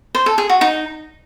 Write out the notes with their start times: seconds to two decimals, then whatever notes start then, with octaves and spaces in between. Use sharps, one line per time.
0.15 C5
0.26 A4
0.38 G#4
0.49 F#4
0.61 D#4